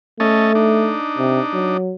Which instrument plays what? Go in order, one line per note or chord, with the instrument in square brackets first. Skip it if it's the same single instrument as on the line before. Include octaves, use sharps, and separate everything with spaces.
[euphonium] A3 [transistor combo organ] C#4 A4 D#5
[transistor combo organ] D4 D#4
[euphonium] C3
F#3